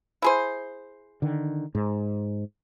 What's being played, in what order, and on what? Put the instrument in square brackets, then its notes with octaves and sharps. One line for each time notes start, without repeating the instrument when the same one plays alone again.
[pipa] E4 G#4 C5
[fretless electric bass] D3 D#3
G#2